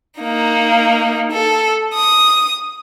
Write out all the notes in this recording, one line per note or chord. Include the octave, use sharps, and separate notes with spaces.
A#3 D#4
A4
D#6